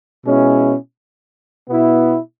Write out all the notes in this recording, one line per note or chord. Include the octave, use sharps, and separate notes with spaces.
B2 G#3 C#4 E4
B2 B3 E4